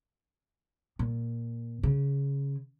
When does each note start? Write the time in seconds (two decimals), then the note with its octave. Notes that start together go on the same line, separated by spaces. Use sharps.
0.99 A#2
1.83 C#3